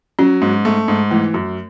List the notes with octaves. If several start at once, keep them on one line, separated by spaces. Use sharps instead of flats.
F#3 C#4
G#2
A3
G#2
E3 A3
F#2